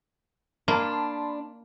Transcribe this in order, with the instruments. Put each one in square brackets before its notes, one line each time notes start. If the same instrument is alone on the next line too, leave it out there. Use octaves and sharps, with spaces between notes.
[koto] A#3 [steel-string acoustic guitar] D4 [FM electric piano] A5 B5 C6